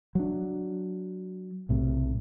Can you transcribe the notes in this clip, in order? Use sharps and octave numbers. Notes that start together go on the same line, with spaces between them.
F#3 D4
B1 A2 C3